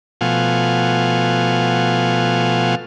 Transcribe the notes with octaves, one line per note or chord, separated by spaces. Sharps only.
B2 F3 A3 F5 F#5 G#5